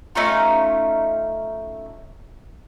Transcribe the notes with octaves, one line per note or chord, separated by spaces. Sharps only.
A3 C#4 D#4 F4